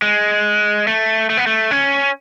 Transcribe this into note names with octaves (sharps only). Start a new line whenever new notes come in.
G#3
A3
A3
B3
A3
C#4